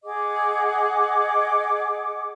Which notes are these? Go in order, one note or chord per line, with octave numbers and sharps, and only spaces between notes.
G#4 D#5 F#5 D6